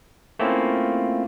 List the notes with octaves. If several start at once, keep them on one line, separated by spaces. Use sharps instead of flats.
A3 A#3 C4 C#4 E4 F4